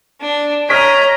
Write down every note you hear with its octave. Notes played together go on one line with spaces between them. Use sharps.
D4
C#5 D#5 A#5 F6 B6 D7